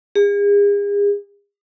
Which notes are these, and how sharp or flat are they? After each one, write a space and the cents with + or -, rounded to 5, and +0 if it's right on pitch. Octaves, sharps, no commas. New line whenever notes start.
G#4 -40